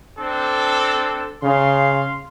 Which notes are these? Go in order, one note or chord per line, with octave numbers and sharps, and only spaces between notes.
C4 D4 A4
C#3 F5 C6